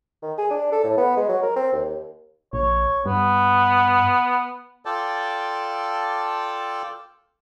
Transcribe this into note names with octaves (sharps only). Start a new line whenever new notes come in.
D#3
G#4
D4
A4
A2
B3
G#3
F#3
A#4
C4
D#2
A#1 C#5
G2 B3
F4 A4 D5 G5 A5